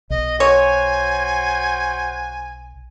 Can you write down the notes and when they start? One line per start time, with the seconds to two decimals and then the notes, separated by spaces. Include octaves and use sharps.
0.10 B1 D#5
0.40 F#4 C5 C#5 G#5